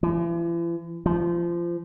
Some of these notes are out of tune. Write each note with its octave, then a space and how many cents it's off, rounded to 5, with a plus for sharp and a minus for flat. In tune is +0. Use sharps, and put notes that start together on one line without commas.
E3 +45
F3 -25